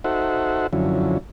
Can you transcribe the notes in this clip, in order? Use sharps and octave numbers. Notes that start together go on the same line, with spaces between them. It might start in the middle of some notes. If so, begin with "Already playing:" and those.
D#4 F#4 A4 C5 E5 F#5
F#2 D3 F3 F#3 C#4 E4